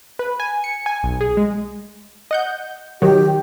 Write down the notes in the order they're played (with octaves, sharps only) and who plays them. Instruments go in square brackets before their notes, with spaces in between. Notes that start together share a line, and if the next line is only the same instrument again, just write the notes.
[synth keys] B4
G#5
C#7
G#5
B1
G#4
G#3
[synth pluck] D#5 F#5 G6
[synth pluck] D#3 F#3 [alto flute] G4